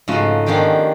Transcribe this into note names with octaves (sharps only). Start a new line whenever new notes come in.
G#2 C#3 F3 A3 F#4
D#3 F3 B3 C#4 D4 G4